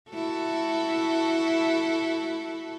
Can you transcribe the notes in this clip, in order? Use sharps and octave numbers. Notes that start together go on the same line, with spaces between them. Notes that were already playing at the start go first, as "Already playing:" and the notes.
E4 F#4 A4